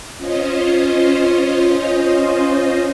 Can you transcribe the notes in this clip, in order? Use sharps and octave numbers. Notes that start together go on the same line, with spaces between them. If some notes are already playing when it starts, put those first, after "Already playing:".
C#4 F4 C5 D#5